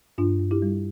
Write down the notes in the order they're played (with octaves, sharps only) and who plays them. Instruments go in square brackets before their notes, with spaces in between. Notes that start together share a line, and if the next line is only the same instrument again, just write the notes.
[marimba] G2 D4 F4
G2
E4 G4
G3